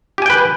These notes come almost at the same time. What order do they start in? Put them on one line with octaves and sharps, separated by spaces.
G4 G#5 G5 B4